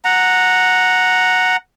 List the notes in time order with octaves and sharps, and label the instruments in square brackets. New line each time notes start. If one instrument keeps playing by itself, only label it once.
[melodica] F#5 A#5